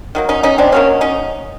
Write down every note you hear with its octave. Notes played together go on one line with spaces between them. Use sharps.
D#3 F#3 A#3
C#4 D#4
C#4 D#4
C4 D4
D#3 F#3 A#3 C#4
C#4 D#4